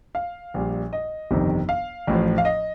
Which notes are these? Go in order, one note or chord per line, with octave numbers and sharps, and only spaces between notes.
F5
A#1 A#2 G3
D#5
G1 F2 C3 D#3
F5
A1 A2 F3
F5
D#5